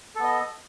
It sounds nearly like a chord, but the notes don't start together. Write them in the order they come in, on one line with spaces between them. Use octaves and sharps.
A4 B3 D#5